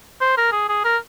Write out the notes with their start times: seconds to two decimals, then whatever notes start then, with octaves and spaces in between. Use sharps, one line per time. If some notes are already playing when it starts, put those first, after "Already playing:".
0.21 C5
0.37 A#4
0.52 G#4
0.69 G#4
0.85 A#4